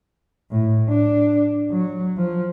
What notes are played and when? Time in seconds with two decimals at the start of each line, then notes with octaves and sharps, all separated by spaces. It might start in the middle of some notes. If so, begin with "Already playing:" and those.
0.51 A2
0.89 D4
1.71 F#3
2.17 F3